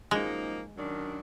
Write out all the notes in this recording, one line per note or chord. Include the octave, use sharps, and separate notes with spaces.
F#2 F3 G#3 A#3 D#4
F#2 D#3 F#3 D4